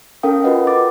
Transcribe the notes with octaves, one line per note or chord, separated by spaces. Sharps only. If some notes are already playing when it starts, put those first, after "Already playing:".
C#4 A4 A#4 F5 G5 D#6
F4 F#4 B4 D#5 F#5
D6 A6